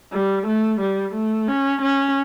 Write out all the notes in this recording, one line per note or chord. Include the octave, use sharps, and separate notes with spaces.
G3
A3
G3
A3
C#4
C#4